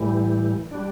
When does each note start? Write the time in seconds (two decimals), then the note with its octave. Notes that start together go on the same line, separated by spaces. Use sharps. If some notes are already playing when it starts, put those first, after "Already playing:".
Already playing: A2 E3 G3
0.71 G3 D4